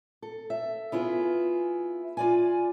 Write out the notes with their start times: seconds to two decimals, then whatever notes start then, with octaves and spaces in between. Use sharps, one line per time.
0.22 A4
0.50 E5
0.92 B3 E4 F4 G#4
2.17 F4 D5 G#5